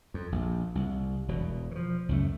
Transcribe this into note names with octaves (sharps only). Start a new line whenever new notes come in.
F2
A#1
C2
E1 B2
E3 F3
C#2 F#2 A3